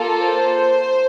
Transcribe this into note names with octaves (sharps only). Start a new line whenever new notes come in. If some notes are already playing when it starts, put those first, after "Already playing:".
Already playing: A#3 F4 A4
C5